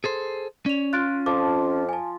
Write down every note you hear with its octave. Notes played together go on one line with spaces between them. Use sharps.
G#4 A4 C5
C#4 D5 F7
F4 F#6 A6 D7
F2 F3 D6
G#5 A5